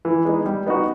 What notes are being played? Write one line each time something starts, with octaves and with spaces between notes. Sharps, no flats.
E3
G#3 B3 D#4
G3
B3 D#4 F#4